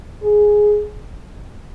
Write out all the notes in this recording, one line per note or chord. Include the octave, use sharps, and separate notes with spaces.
G#4